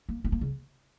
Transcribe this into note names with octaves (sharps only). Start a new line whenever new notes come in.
A#3
B3
A#3
C#3